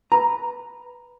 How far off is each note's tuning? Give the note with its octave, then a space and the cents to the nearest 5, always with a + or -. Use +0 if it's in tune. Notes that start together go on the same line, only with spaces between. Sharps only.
B4 -5 A#5 +0